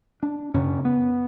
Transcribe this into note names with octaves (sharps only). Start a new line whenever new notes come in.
D4
F#2 C#3 C#4
B3